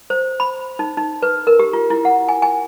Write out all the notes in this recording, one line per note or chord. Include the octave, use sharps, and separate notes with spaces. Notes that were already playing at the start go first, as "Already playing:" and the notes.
C5
B5
D#4
D#4
B4
A#4
G4
F4
E4
F#5
G#5
G#5